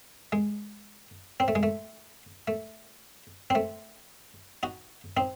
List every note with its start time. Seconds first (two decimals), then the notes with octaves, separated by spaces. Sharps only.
0.32 G#3
1.40 C4
1.48 A3
1.55 G#3
1.63 A3
2.48 A3
3.50 C4
3.55 A3
4.63 D#4 F#4
5.17 C4 D#4